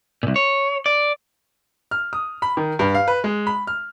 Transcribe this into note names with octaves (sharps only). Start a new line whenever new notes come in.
C2 A#2
C#5
D5
F6
D#6
B5
D#3
G2
F5
B4
G#3
B5
F6